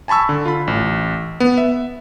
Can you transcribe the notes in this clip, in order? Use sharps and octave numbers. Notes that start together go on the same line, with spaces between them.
G#5 A5 B5 C#6 E6
D3
F4 B5
A1
B3
E5